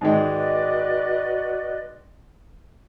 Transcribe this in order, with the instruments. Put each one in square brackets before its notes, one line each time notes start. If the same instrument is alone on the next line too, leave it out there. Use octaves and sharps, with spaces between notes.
[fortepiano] G#2 D#3 G#3 [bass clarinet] F#4 [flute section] B4 D5 D#5